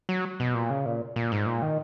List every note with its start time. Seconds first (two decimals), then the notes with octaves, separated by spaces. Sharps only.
0.09 F#3
0.40 B2
0.54 A#2
0.70 C#3
0.86 A#2
1.16 A#2
1.32 G#2
1.46 A#2
1.62 D#3